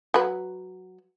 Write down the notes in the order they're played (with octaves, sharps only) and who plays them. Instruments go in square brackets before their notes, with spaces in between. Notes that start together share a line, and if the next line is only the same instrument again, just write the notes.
[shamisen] F#3 B4